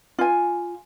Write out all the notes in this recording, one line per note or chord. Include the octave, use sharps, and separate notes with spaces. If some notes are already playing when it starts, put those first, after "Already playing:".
F4 G#5